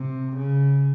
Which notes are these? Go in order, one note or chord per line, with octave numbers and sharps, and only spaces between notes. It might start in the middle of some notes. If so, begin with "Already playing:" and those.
Already playing: C3
C#3